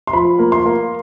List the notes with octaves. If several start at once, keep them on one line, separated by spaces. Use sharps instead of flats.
C6
F3 B5
A#3
C6
A#3